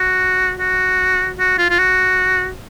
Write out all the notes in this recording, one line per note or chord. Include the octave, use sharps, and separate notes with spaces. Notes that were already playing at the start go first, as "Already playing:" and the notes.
Already playing: F#4
F#4
F#4
F4
F4
F#4